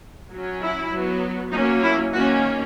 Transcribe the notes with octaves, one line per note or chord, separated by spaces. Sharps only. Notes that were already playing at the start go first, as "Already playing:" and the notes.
F#3 C#4
E4
F#3 B3
F#3 A#3 C#4 D#4
E4
D#3 A#3 C#4 F#4